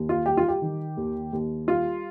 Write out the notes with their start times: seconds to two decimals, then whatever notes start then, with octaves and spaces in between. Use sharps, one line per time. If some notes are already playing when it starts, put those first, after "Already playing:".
Already playing: D#2
0.09 F4
0.26 G3 G4
0.37 F4
0.48 G4
0.62 D#3
0.97 D#2
1.33 D#2
1.67 G3 F4